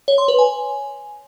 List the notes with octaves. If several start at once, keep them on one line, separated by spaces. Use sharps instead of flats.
C#5
C6
B4
G#5